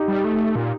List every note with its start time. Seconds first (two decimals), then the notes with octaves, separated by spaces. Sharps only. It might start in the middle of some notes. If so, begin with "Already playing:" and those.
Already playing: D#4 G4
0.08 G3
0.25 A3
0.56 A#2